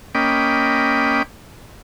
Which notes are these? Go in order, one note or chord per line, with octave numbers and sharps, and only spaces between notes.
A#3 C#4 D#5 G5 B5 D6